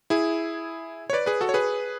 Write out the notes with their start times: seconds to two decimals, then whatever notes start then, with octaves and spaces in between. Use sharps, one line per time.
0.10 E4 G#4
1.10 C#5
1.13 B4 D5
1.26 G#4 B4
1.41 F#4 A4
1.49 C#5
1.54 G#4 B4